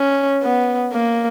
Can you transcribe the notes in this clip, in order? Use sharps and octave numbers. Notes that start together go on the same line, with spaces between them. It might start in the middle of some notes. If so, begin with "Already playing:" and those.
Already playing: C#4
B3
A#3